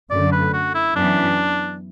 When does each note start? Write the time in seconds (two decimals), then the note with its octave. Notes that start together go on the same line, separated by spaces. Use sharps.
0.11 F#2 D3 A3 D5
0.32 B4
0.53 F#4
0.74 E4
0.95 F#2 E3 B3 D4